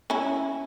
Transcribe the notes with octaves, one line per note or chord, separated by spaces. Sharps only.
C#4 E4